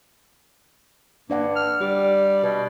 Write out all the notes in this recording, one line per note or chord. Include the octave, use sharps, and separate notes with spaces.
G2 A#3 D4 D5 F#5
F6
G3 G4 D5
B2 B4